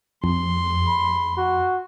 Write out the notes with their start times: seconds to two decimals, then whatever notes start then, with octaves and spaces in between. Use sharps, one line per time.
0.24 F2 C6
0.87 B5
1.37 F#4